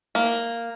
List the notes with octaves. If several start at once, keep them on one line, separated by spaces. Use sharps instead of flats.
A#3